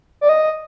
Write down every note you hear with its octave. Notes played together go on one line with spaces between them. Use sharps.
D5
D#5